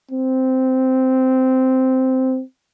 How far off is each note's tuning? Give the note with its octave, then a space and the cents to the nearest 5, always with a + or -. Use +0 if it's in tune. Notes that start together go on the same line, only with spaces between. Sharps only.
C4 -10